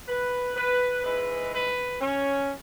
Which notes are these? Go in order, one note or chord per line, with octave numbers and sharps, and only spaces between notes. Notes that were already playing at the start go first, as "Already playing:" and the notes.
B4
B4
G#2 E3 G#3 B4
B4
C#4